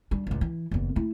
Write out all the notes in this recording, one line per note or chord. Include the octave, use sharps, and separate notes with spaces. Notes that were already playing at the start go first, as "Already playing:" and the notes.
G3 D4
C#2 A2
E3
F#1 E2
A3 E4